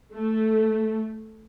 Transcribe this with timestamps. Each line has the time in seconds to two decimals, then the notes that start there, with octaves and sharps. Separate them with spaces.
0.13 A3